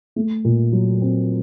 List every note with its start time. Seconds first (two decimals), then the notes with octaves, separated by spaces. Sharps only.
0.16 A3
0.45 A#2
0.73 F#3
1.01 C4